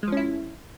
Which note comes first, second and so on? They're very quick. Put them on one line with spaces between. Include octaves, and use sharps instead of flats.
G#3 F3 C#4 E4